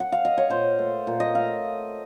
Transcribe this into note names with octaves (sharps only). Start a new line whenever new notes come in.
F#5
F5
D#5
C#5
A#2 C5
A3
A#2
D#5
A3 F5